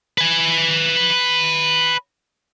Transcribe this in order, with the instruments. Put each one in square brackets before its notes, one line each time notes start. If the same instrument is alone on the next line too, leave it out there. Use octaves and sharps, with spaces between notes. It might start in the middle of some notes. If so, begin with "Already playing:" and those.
[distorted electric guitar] B4 G#5